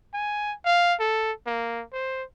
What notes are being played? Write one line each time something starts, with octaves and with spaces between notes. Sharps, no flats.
G#5
F5
A4
A#3
C5